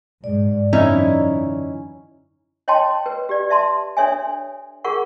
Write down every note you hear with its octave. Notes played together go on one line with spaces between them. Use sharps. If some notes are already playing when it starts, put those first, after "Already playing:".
G#2 D5
F#2 D3 E3 C#4 D#4 E4
C#5 D#5 G5 A5 C6
B4
G4 D5
E5 A5 C6
D4 A4 C#5 E5 G#5
F4 G#4 A#4 F#5 C#6